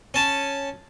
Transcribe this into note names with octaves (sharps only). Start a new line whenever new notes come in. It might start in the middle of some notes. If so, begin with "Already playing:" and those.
C#4 A5